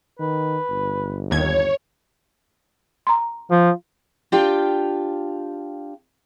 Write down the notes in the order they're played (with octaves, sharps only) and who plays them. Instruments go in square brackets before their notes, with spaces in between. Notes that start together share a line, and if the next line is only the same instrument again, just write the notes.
[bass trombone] D#3 [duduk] B4
[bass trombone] G1
[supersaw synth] D#2 G#6 [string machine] C#5
[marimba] A#5 C6
[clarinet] F3 [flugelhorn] F4
[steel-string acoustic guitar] D4 F4 G4 F5 G5